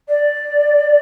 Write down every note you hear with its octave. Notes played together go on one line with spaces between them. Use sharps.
D5